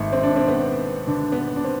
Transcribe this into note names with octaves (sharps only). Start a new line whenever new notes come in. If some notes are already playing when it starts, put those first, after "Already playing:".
Already playing: G#1 A3
C4
D4
C4
B3
D3 D4
B3
D4
C4